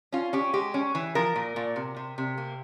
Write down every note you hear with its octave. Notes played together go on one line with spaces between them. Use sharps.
C#4 F4
C#4 G4
G#3 G4
C#4
E3
F3 A#4
A#2
A#2
C3
C3
C3
A#3